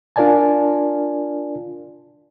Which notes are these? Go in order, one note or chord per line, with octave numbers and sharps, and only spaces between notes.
D4 F4 A#4 D5 G#5 A5